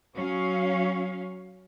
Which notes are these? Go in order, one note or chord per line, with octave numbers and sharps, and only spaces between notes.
F#3 C#4 F5